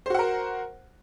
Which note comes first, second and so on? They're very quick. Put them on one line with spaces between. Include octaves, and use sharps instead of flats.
C5 F#4 F#5 A#4